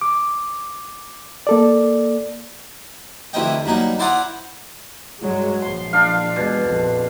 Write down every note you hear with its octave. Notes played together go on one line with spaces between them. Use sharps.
D6
A#3 A4 D5
D2 C3 E3 F3 D#5 G5
G2 F#3 A#3 D#4
E4 C5 D5 F#5 A#5 D#6
G2 F#3 G#3
A#1 F3 C6
D4 F5
E2 B2 G#3
A#1 F2